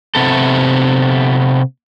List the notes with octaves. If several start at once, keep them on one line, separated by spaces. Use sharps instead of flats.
C3 B3 A4